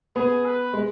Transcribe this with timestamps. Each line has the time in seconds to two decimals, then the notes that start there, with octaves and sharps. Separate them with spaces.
0.16 B3 G#4
0.46 B4
0.73 G#3